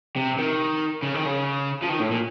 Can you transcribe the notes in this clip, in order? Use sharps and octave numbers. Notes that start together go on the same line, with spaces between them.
C3
D#3
C#3
D#3
C#3
F3
D#3
A2
A#2